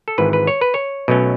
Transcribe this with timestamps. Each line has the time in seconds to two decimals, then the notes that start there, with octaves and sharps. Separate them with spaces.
0.08 A4
0.18 G#1 G#2 E3 B4
0.33 B4
0.47 C#5
0.61 B4
0.74 C#5
1.08 B1 B2 F#3 A3 C#4